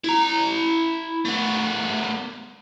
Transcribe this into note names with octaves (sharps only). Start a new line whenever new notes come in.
E4 A#5
A3 B3